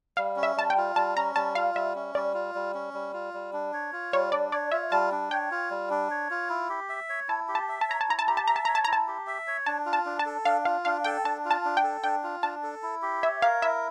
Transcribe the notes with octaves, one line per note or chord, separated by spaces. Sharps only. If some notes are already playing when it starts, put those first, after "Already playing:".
G3 F5
C#4
E5
G3 A5
G5
F4
G3 A5
C#4 A#5
G3 A5
F4 F5
G3 E5
C#4
G3 D5
F4
G3
C#4
G3
F4
G3
D4
C#5
F4
G3 C#5
D4 D5
C#5 D5
F4 E5
G3 A5
D4
C#5 G5
F4
G3
D4
C#5
F4
E4
G4
E5
C#5
E4 A5
G4
A5
E5
A5
C#5 A#5
A5
E4 A#5
A5
G4 A#5
A5
E5 A#5
A5
C#5 A#5
A5
E4 A#5
A5
G4
E5
C#5
D4 A5
F4
A5
D4
A5
A4
D4 F5
F4 F5
D4 F5
A4 G5
D4 A5
F4
A5
D4
G5
A4
D4 G5
F4
D4 A5
A4
E4
G4
C#5 E5
A#4 F5
E4 E5